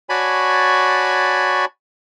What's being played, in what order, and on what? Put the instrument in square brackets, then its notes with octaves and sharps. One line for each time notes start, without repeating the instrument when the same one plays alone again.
[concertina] F#4 C#5 D5 G#5 A5 B5